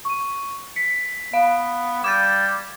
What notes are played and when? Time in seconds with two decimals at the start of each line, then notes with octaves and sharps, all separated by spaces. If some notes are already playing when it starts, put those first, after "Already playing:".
0.05 C#6 D#7
0.76 B6 C#7
1.33 B3 F5
2.04 G3 D6 G#6 A6 E7